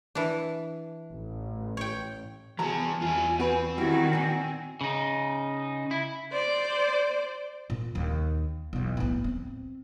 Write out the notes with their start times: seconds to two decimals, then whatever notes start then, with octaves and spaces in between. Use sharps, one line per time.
0.15 E3 D4
1.12 A1
1.77 C#5 G5
2.59 C2 E3 F#4 G#4 A5 A#5
3.02 E2 F4 E5 G#5
3.40 C4 F#4 B4
3.78 D#3 G3 E4 F#4 G4
4.13 A#2 E3 G#5
4.81 C#3 D#4
5.91 E4
6.33 C5 D5
7.70 A#2
7.95 D#2 D#4
8.73 B1 E2
8.97 A2 B3
9.24 C4